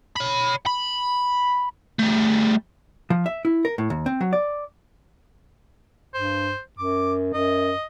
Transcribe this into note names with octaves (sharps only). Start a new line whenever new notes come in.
C#5 B5
B5
G3 A3
F3
E5
E4
A#4
A2
D#2
C4
F#3
D5
G2 C5
F#2 D6
F#2 D#5